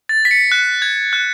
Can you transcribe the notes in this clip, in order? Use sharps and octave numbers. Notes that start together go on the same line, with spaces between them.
A6
B6
C#7
F#6
G#6
F#6